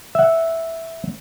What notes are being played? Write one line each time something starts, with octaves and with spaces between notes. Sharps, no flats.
E5 F#5